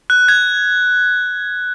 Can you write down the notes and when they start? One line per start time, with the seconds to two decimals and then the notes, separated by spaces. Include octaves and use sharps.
0.10 F#6
0.28 G#6